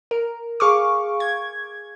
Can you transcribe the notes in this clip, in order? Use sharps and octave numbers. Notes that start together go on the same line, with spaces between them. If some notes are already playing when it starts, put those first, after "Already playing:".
A#4
G#4 F5 C#6 D6
G#6